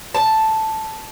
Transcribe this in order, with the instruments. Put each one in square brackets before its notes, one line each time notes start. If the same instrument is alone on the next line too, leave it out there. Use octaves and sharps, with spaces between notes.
[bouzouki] A5